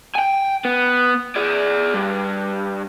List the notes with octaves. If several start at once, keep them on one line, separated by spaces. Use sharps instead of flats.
G5 G#5
B3
G#4 D5
G2